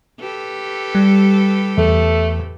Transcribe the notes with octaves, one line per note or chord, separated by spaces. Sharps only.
G4 A4 B4
G3
E2 A3